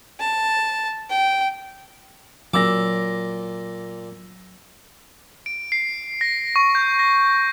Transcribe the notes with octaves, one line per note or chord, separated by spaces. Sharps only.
A5
G5
A#2 F#3 D6 E6 A#6
D7
C7
A#6
C#6
G6
A#6